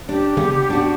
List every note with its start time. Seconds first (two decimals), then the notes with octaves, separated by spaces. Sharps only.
0.09 D4 G4
0.37 C#3 B3
0.70 D4 F#4